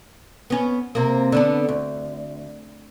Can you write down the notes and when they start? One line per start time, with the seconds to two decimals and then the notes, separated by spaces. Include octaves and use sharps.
0.50 B3 C#4
0.95 C3 A#3
1.32 D3 B3 D4
1.69 D2